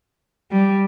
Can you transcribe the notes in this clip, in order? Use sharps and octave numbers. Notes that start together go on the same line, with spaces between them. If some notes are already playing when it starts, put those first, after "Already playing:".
G3